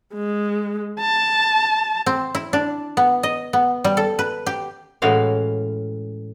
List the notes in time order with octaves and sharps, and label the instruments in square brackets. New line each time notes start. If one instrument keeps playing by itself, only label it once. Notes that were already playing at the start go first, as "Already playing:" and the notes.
[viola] G#3
A5
[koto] C4
E4
D4
B3
D#5
B3
G3
A4
B4
G4
A2 E3 G#3 C#4 F#4 F5